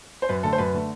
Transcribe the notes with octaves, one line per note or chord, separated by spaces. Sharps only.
C5
F#2 B4
D3 A3 A4
C5
F#2 B4
D3 A3